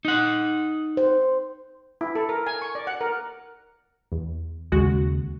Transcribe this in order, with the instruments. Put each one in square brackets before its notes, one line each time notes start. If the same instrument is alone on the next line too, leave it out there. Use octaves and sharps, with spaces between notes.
[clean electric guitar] D#4 F#5
[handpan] C5
[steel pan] E4
A4
A#4
G#5
C#6
D5
F#5
A#4
[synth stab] E2
[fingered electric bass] D#2 C#3 [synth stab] G#3 F#4